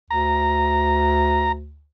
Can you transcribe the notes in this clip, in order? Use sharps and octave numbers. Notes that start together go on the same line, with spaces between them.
D2 A#5